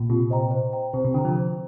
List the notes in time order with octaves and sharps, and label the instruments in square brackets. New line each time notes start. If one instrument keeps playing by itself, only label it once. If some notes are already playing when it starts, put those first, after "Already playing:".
Already playing: [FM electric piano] A#2
[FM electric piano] C3 [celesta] F4
[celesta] C5 D#5 G5 A#5
C5
G5 A#5
[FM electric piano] C3 [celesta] C5
[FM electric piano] C3
[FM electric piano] D3 [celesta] G5
[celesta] A#5
[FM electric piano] F3
[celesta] C5